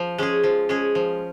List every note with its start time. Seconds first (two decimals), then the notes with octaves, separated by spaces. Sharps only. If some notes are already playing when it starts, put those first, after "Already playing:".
Already playing: F3
0.18 G#3 C#4 G#4
0.43 F3
0.69 G#3 C#4 G#4
0.95 F3